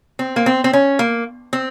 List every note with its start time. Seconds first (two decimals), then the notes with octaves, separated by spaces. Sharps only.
0.19 C4
0.36 A#3
0.46 C4
0.64 C4
0.73 C#4
0.99 A#3
1.53 C4